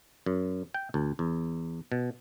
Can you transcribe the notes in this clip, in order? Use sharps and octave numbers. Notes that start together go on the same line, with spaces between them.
F#2
G5
D2
E2
B2